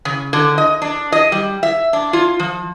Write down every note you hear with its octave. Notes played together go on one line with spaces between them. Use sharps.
C#3
D3
D#5
D4
D#5
G3
E5
D4
F4
F3